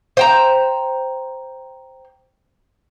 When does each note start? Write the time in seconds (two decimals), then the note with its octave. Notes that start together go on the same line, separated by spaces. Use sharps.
0.17 C5 G5 A#5